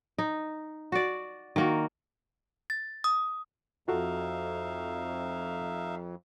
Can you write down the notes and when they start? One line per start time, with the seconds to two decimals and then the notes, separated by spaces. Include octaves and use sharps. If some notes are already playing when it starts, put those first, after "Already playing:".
0.18 D#4
0.92 F#4 D5
1.56 D#3 A#3 F#4
2.70 A6
3.04 D#6
3.88 F2 D#4 F4 F#4 A4 E5 F5